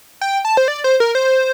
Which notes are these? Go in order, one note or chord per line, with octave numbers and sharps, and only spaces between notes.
G5
A5
C5
D5
C5
A#4
C5